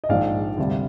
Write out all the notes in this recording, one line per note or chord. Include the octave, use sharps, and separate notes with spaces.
D#5
A#1 G#2 D#3 G#3 D5 F5
D2 C3 G3